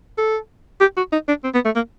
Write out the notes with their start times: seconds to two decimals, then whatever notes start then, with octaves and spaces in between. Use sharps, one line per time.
0.18 A4
0.80 G4
0.97 F#4
1.12 D#4
1.28 D4
1.44 C4
1.54 B3
1.65 A3
1.75 A#3